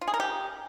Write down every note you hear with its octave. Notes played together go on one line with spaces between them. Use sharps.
F4
G#4
A#4
G4